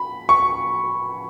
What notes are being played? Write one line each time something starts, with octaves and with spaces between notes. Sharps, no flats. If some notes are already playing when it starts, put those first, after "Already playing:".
Already playing: B5
C#6